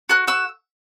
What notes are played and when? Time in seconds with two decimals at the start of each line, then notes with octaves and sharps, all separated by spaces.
0.09 F#4 F#6
0.27 F#4 E6